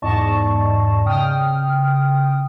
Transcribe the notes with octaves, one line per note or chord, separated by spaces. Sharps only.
E2 G#2 D5 D#5 A5 C#6
C#3 G5 D#6 F6